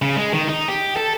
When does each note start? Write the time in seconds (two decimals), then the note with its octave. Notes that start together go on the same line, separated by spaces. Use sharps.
0.02 C#3
0.16 G#3
0.33 D#3
0.48 D#4
0.68 G4
0.97 A4